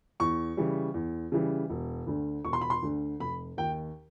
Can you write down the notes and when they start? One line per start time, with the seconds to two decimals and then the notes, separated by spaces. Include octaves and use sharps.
0.20 E2 C#6
0.57 C#3 E3 G3
0.94 E2
1.32 C#3 E3 G3
1.70 E1
2.07 D2 D3
2.45 E1 C#6
2.53 C6
2.61 B5
2.70 C6
2.82 D2 D3
3.20 F1 B5
3.57 D#2 D#3 G5